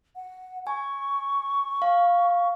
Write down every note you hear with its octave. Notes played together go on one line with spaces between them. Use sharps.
F#5
G#5 C#6
F5